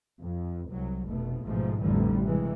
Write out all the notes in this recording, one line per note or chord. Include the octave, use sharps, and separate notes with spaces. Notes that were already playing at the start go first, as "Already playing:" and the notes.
F2
C2 F#3
F1 B2 A3
A1 G#2 B2 F3 A3
A1 F2 A2 D3 E3 G3
G2 C3 E3 G#3